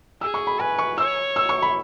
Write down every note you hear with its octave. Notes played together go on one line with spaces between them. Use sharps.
G#4 E6
C#6
B5
B4 G#5
C#6
C#5 E6
E6
C#6
B5